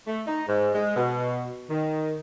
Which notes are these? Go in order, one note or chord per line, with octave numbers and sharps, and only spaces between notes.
A3
D#4
G#2
G#3
B2
D#3